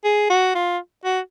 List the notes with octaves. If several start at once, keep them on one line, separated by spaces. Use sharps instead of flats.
G#4
F#4
F4
F#4